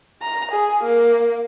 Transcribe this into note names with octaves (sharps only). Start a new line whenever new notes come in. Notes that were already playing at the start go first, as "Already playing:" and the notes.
A#5
G#4
A#3